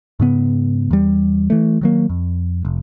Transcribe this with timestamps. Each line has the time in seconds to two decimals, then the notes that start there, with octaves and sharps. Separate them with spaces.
0.20 G#2 C#3 B3
0.91 E2 G3
1.50 E3 A3
1.81 D#3 F#3 A#3
2.09 F2
2.65 F1